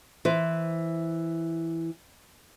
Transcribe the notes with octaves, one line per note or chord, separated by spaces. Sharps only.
E3 C5